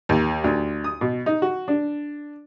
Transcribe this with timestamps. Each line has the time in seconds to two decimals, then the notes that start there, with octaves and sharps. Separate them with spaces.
0.09 D#2
0.44 D2
0.84 D#6
1.01 B2
1.26 D#4
1.42 F#4
1.68 D4